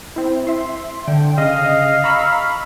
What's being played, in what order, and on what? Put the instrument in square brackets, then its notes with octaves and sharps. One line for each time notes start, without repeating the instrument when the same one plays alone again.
[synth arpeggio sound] C4 E4
E5 C6
[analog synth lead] D3 [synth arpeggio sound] G5
[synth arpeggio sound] C#3 [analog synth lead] D#5 [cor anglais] F5
[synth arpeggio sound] A#5 C#6 E6 [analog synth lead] B5